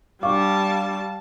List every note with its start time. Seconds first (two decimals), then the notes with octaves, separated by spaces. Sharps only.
0.23 G3 D4 F5 A5 C#6 D6